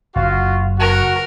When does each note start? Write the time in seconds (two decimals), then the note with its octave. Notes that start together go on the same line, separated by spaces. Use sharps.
0.16 F#1 F4 F#4 F5
0.79 F#4 A#4